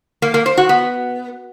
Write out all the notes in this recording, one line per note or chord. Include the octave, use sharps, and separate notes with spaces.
A#3
A#3
C5
F#4
B3